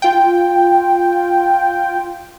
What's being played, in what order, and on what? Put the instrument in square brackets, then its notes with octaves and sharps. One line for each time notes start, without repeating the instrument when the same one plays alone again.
[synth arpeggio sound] F4 G5